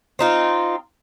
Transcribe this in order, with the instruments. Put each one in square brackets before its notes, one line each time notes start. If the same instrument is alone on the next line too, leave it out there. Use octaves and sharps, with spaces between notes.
[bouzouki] C4 D#4 F4